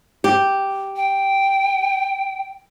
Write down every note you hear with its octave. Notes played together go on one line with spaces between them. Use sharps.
G4
G5